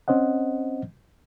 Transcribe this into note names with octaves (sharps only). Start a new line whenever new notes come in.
C4 C#4 C5 D#5 F#5